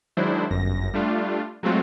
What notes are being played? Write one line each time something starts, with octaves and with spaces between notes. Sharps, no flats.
D#3 F#3 G#3 D4 E4 C5
G1 F#2 A#6
G3 A3 D4 F4
F#3 G#3 A3 C4 F4 F#4